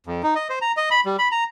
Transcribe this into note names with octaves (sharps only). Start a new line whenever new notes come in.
F2
D#4
D#5
C5
A#5
D#5
B5
G3
B5
A#5